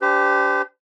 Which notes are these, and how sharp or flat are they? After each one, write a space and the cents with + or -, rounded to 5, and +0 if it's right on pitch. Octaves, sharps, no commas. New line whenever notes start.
D4 -30 G4 +0 C5 -45